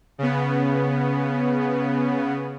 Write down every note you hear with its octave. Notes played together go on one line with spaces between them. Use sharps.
C#3 B3